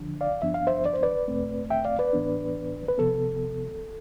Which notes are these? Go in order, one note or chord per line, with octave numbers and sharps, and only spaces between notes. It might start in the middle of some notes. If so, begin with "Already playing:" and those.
Already playing: D3 F3 D4
D5 F5
G2 F3 B3 D4 E5
F5
C5 E5
D5
C5
B4 D5
E2 B2 A3 C4
E5 G5
D5 F5
B4 D5
A2 E3 B3 D4
B4
C3 F3 B3 A4